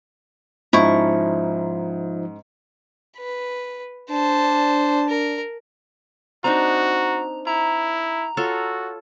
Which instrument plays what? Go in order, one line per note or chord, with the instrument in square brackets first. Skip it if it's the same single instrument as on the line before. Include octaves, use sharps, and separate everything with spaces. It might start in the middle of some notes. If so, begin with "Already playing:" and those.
[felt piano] G#2 C#4 [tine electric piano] F3 D#4 [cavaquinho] E4 C#6
[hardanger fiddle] B4
[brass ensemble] D4 [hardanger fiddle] C5 A5
[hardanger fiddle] A#4
[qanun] C4 D4 D#4 [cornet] F#4 [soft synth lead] A#5
[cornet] E4 [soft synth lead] A#5
[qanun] F4 A4 C#5 [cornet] F#4